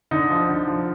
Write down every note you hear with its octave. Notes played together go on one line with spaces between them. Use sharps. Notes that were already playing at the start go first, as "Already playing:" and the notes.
D3 D#4
F3
D3
F3